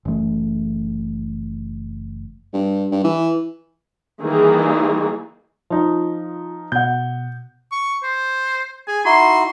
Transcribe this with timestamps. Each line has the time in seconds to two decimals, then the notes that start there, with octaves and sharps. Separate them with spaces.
0.05 F#1 E3 A3
2.54 G2
2.92 G2
3.04 E3
4.22 D#3 E3 G3 A#3 G#4
5.70 F3 D#4 F4
6.72 B2 F#5 G6
7.72 C#6
8.03 C5
8.88 G#4 G#5
9.05 D#4 E4 F#4 C6